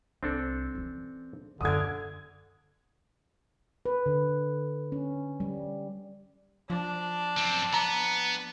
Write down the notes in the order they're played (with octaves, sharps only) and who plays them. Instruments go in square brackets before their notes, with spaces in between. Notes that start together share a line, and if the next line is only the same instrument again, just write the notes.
[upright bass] C2 [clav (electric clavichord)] C4 D4 A4
[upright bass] E3 C#4
[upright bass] F#2 A#3 [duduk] D3 [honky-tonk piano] D#6 G#6
[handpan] B4
D3
C#4
G3
[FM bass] F3 [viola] D4
[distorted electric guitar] F#2 C4
[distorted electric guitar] B3 [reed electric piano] A#5